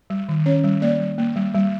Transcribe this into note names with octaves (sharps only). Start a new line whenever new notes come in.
G3
D#3
C#4 C#5
G3
A#3 D5
G3
A#3
G3
G3